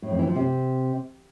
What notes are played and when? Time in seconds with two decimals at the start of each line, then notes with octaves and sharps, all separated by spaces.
0.02 A2
0.11 F2
0.19 E3
0.27 F3
0.36 C3